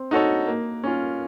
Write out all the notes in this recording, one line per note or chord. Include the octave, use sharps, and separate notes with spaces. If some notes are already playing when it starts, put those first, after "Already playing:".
Already playing: C4
D#4 F#4 A4 C#5
A#3
C#4 F4